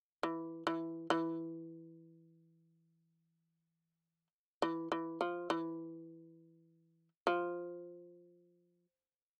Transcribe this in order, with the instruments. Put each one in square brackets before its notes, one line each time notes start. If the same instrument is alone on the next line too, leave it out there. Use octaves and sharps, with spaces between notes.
[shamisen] E3
E3
E3
E3
E3
F3
E3
F3